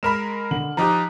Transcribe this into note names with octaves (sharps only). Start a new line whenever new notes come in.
G#3 A#4 B5 F6 E7
D3 F#7
F3 D#4 G4 A#5 D#6 F#6